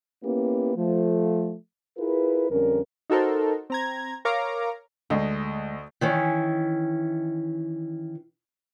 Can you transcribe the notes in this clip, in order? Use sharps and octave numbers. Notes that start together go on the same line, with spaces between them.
A#3 B3 C#4 E4 G4 B4
F3 A3
E4 F4 G#4 A#4 B4
F2 D3 G3 C#4 A#4
D#4 F#4 A4 A#4 C5
C4 A#5 G#6
A#4 C#5 F5 A#5 D6
D2 G#3 A3 D#5
D#3 E3 C#4